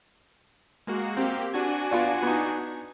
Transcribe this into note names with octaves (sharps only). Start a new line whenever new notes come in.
G#3 A#3 F#4
A#3 C4 G4
D4 F#4 G#5
B3 F4 D5
B3 D#4